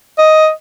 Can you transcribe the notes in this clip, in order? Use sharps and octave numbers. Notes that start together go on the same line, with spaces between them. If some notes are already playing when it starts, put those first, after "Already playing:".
D#5